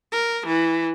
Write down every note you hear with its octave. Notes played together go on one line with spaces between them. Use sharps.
A#4
E3